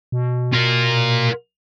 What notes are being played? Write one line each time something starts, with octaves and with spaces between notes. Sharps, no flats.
B2
F4 A#4